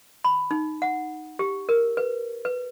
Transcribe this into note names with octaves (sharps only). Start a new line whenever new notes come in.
B5
D#4
F#5
G4
A#4
B4
B4